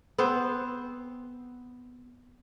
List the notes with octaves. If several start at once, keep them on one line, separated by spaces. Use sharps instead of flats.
B3 C4 C5